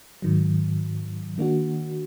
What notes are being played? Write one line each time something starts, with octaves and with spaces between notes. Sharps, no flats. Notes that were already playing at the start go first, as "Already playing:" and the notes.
G#2 D#3 F#3
D#3 A#3 D4 F#4